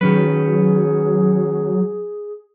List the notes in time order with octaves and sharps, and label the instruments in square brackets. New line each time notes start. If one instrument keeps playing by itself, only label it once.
[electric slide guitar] D#3 C#4 B4 [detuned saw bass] F#3 [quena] G#4